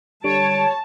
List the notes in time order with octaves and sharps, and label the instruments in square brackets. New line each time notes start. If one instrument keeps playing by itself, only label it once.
[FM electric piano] D3 G3 [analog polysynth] C#5 [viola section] A5 [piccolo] D7